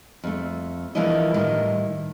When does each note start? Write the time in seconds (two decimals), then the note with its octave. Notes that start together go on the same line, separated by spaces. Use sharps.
0.24 F2 A3
0.95 E3 F3 A#3 D4 E4 D#5
1.34 A2 D#3 G3